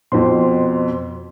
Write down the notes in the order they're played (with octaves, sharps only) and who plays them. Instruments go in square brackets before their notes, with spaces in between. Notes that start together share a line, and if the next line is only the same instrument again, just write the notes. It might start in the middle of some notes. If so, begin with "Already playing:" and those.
[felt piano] F2 B2 [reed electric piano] C5 C6